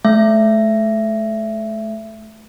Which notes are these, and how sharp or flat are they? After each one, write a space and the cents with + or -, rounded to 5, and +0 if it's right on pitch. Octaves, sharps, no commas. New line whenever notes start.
A3 -30 E5 +20